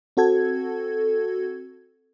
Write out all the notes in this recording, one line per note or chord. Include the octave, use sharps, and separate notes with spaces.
C4 F#4 A4 G#6